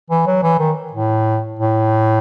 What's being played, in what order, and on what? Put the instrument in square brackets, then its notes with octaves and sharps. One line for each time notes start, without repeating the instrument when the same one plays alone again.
[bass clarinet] E3
F#3
E3
D#3
A2
A2